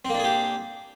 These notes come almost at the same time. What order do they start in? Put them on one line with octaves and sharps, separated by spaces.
C4 A#3 D4 G#4 G4